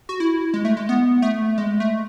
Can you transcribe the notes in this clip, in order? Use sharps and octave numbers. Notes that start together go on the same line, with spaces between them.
F#4
E4
G#3
A3
G#3
B3
A3
G#3
A3